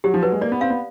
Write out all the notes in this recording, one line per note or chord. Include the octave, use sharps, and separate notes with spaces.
F#3 G4
F3
F#3 B4
G#3
A#3 D5
B3
C4 F5
B3